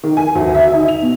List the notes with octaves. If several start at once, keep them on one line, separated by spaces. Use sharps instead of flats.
D#3
G#5
D2
E5
D#4
F7
B2